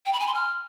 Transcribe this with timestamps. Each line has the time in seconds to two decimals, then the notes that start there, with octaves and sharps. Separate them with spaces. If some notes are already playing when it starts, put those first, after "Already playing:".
0.06 G5
0.13 B5
0.20 G#5
0.27 C6
0.34 F6